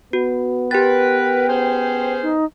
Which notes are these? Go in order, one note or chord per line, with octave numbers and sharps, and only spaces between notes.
B3 F#4
G4 A#4 B4 G5 A6
C#4 G#4 C5
D#4